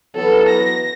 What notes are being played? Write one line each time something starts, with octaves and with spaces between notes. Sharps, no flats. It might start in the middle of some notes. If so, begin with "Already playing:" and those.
E3 F#3 B3 A4
A#6